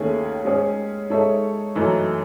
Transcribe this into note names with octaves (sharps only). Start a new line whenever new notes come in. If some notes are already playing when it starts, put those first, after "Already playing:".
Already playing: D#2 D#3 A3 C#4 G#4
G#3 C#4 G#4
G#3 D#4 A4 C#5 E5
F#2 E3 A3 D#4